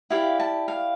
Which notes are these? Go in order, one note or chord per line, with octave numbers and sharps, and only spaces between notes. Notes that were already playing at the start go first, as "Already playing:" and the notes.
E4 G4 D5 F5
A5
F5